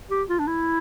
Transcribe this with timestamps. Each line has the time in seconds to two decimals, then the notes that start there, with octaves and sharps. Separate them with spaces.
0.11 G4
0.29 F4
0.39 D4
0.47 E4